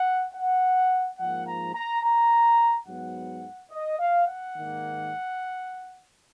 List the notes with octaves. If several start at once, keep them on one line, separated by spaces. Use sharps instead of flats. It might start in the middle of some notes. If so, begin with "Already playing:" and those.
Already playing: F#5
F#5
G#2 F3 A#3 F#5
A#5
A#5
A#5
G#2 F#3 B3 F#5
D#5
F5
F#5
G#2 D#3 A#3